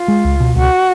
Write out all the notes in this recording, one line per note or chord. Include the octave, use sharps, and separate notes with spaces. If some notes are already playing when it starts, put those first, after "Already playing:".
Already playing: F4
G#3
C#2
B2
C#2 F#4